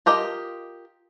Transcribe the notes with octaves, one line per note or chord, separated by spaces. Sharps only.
F4 G4 A#4 D#5